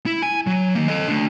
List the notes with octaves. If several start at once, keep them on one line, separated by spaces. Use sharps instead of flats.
E4
G#5
F#3
D#3 A#3
A4 D#5
A3 D4